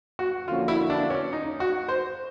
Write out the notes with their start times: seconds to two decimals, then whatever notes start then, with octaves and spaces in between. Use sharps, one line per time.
0.19 F#4
0.47 D3 F3 A#3 C#4 F4 F#4
0.68 E4
0.90 D4
1.10 C#4
1.33 D#4
1.60 F#4
1.88 C5